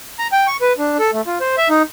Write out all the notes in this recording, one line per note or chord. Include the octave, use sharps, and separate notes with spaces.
A#5
G5
C#6
B4
D4
A4
A3
F4
C5
E5
D#4